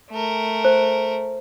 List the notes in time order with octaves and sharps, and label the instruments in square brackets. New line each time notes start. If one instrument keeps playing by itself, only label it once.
[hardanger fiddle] A3 A#4
[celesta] C5